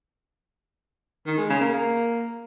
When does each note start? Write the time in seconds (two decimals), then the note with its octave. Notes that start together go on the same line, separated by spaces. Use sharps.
1.27 D#3
1.38 G#3
1.49 C#3
1.61 A#3
1.72 A#3